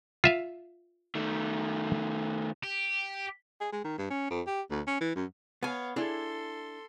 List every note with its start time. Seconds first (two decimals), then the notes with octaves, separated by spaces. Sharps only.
0.24 F4 E5 F5
1.15 D#3 A3
2.64 G4
3.61 G#4
3.72 G#3
3.84 D#3
3.98 G2
4.10 C#4
4.30 F2
4.47 G4
4.71 D2
4.87 C#4
5.01 E3
5.16 F#2
5.63 B3 C#5 F5 G#5
5.96 D4 E4 G#4 A4 C6